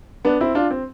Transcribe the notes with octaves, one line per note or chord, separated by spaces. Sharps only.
B3 D4
C4 E4
D4 F4
C4